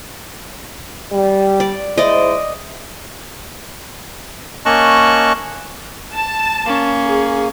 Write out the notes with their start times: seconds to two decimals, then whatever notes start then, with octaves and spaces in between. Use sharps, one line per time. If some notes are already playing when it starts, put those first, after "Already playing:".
1.12 G3
1.60 D5
1.98 G#3 E4 C5 D5 D#5
4.66 A#3 C#4 D#5 A5 C#6 F#6
6.14 A5
6.66 A#3 C#4
7.06 G#4